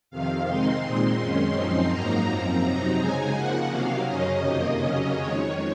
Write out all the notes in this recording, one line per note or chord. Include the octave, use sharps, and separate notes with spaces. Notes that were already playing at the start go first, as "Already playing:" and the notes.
F2 C3 D#3 F5
D#3 G#3 C4 D#4 C6
A#2 G#3 C4 D#4 C6
F#2 D#3 G#3 C#4 C6
F#2 F3 C4 D#4 C6
G#2 F#3 A#3 D#4 A#5
F#2 F3 C4
C3 F#3 C4 D#4
C#3 G#3 D#4 G#5
C#3 F3 A#3 F#5
C3 D#3 F#3 A#3 F5
F#2 C#3 F#3 C#4 D#5
F2 C3 D#3 A#3 D#5
C#3 F#3 C#4 D#5
F2 D#3 G#3 C#5